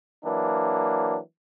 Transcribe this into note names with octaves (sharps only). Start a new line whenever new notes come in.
E3 F#3 A#3 D4